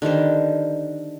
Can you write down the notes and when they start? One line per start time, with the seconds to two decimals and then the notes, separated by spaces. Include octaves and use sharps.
0.02 D3 D#3 G3 C5